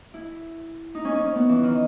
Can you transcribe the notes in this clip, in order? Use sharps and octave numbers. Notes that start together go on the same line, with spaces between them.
E4
D#4
C#4
C#4
C#4
B3
E3
D#3